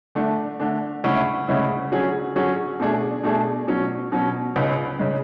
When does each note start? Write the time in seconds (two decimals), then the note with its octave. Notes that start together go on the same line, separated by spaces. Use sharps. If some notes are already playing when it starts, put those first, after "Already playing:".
0.15 D3 A3 D4
0.60 D3 A3 D4
1.04 D2 C#3 G#3 C#4 E4
1.48 D2 C#3 G#3 C#4 E4
1.92 D3 F#3 C#4 G#4
2.36 D3 F#3 C#4 G#4
2.80 B2 A3 D4 G#4
3.23 B2 A3 D4 G#4
3.68 B2 F#3 C#4
4.12 B2 F#3 C#4
4.56 C#2 C#3 G#3
4.99 C#3 G#3